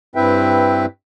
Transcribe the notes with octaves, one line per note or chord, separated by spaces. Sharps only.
G2 C4 E4 B4 E5 G5